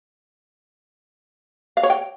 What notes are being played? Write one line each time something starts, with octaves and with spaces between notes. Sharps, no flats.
F5
C#5
G5